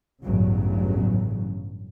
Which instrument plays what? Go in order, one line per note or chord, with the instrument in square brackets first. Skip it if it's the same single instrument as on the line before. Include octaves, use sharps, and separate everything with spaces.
[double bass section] A1 E2 G2 C#3 F#3